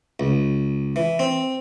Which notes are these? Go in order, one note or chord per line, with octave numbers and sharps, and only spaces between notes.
C#2
E3
C4